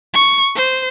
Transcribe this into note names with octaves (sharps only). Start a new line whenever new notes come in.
C#6
C5